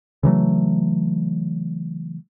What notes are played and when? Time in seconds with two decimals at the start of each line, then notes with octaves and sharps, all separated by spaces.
0.23 C#3 E3 F#3 A3